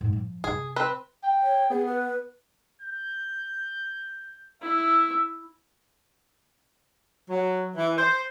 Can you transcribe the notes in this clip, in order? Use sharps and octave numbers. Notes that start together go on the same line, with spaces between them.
G#2
F3
C3 B3 G#4
C4 B4
G5
C#5
B3 G#4
B4
G6
E4 E5
F#3
E3
C5